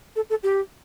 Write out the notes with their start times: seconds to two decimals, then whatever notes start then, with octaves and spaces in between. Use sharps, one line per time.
0.16 A4
0.30 A4
0.43 G4